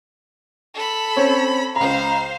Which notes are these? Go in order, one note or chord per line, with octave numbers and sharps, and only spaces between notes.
A4 B5
C4 C#4 C#5
C#2 C5 F5 A#5